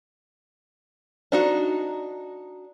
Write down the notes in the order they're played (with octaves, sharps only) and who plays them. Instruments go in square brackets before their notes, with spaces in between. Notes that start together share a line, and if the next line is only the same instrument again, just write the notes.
[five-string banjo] D4 D#4 F#4